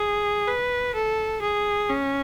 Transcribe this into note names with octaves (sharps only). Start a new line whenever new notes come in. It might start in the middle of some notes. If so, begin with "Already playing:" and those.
Already playing: G#4
B4
A4
G#4
C#4